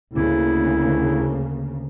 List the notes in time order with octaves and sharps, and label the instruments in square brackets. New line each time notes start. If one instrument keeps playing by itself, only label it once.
[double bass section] D2 C#3 A#3 [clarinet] E4